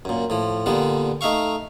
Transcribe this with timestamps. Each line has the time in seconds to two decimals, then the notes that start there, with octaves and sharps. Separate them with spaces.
0.05 F#2 A#2
0.30 A2 F3
0.66 A#2 D3 G3 B3
1.21 A3 D#4 E5 F5 C#6